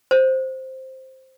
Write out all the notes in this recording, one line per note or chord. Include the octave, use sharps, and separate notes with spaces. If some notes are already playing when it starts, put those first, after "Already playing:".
C5